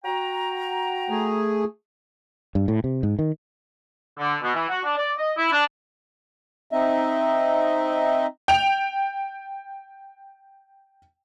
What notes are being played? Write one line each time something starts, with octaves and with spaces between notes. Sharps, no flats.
F#4 G5 A#5
A3 G#4
G2
A2
C3
G#2
D#3
D3
B2
E3
F#4
D4
D5
D#5
E4
D4
C4 D#4 D#5 E5
G5 F7